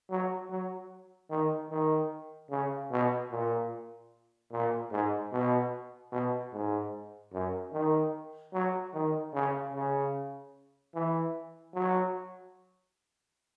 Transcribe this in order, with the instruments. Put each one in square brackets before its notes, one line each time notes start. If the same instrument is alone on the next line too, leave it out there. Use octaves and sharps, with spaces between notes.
[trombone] F#3
F#3
D#3
D#3
C#3
B2
A#2
A#2
G#2
B2
B2
G#2
F#2
D#3
F#3
D#3
C#3
C#3
E3
F#3